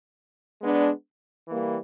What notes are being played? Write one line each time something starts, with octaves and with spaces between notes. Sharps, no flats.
G#3 B3 D4
E3 G3 A#3